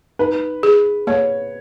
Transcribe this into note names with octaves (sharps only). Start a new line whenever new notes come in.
D#4 B4
G#4
A#3 C#5